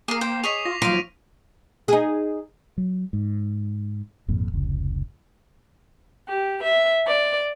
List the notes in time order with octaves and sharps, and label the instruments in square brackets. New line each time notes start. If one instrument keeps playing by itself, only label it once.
[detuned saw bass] A#3 [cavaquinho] G#4 A#4 [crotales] D6 C7
[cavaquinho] C5 G5
[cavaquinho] G#4 C#5 D#5 [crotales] C#6 B6 F7
[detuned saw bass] F4 [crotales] A#6
[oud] D#2 F3 [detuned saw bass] F#3 [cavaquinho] F5 C6 [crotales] A#6 D7 D#7
[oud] D#4 G#4
[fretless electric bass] F#3
G#2
G#1 F2 A#2
F1 C#2
[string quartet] G4
E5
D5